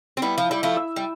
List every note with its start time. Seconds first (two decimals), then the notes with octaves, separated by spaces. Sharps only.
0.17 C4
0.22 G3 B3 E4
0.38 F3
0.49 G3 E4
0.63 F3 A3
0.77 E5
0.96 G3